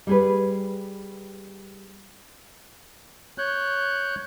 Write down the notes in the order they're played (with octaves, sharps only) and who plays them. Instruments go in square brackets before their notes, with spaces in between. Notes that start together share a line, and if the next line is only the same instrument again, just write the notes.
[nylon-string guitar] G3 G#4 B4
[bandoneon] C#5 F#6 G6